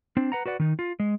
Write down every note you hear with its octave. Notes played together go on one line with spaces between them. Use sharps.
C4 D4
B4 F#5 A#5
F#4 B4 D5 F#5
D#3 D#4
F4
G#3